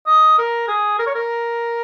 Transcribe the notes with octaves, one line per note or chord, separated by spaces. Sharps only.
D#5
A#4
G#4
A#4
C#5
A#4